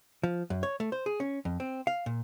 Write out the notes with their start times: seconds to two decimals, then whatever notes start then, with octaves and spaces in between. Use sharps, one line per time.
0.23 F3
0.50 F#2
0.63 C#5
0.80 A3
0.92 C5
1.06 G#4
1.20 C#4
1.45 F2
1.60 C4
1.87 F5
2.06 A#2